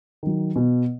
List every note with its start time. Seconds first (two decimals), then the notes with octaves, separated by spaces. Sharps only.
0.23 D#3 F#3
0.56 B2